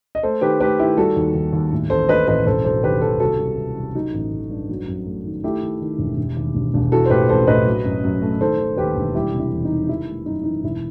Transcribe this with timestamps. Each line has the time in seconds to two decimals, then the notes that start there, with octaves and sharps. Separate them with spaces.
0.15 D#5
0.23 A3 A4 C5
0.41 D#3 G4 B4
0.60 A3 G4 B4
0.79 D#3 E4 G4
0.97 G3 F#4 A4
1.16 D#2
1.34 D#2
1.53 D#2
1.72 A2
1.90 A1 A4 C5
2.08 A2 B4 D#5
2.27 A1 B4 D#5
2.46 E1 A4 C5
2.64 F#3 A4 C5
2.83 D#2 G4 B4
3.01 D#2 A4 C5
3.20 C2 F#4 A4
3.39 C2
3.58 C2
3.77 C2
3.95 F#3 D#4 F#4
4.14 A1
4.32 A1
4.50 G2
4.69 F#3
4.88 F#2
5.06 A3
5.25 D#3
5.44 A3 E4 G4
5.63 D#3
5.81 D#3
5.99 E1
6.17 E1
6.37 D#2
6.55 E1
6.74 E1
6.92 E3 F#4 A4
7.06 C5
7.10 A2 G4 B4
7.29 A1 A4 C5
7.47 A2 B4 D#5
7.66 F#3
7.84 F#2
8.03 F#2
8.22 A3
8.41 D#3 A4 C5
8.59 D#3
8.77 D#2 G4 B4
8.97 E1
9.15 G3 E4 G4
9.33 C3
9.39 E4
9.52 E2
9.65 D#4
9.70 D#3
9.89 E3 E4
10.07 A3
10.26 F#2 D#4
10.43 E3 D#4
10.64 E1 E4